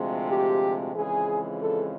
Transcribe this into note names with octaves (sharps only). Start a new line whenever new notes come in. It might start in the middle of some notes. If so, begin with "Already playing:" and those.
Already playing: D2 C3 F3 G#3
G4
F2 C#3 E3 G#3 G#4
A4